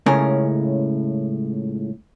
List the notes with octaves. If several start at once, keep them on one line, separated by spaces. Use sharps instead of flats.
C#2 A2 C#3 C#4 A#4